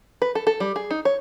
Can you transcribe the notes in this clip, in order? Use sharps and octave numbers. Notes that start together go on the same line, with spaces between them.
B4
A4
A4
G3
G#4
D#4
C#5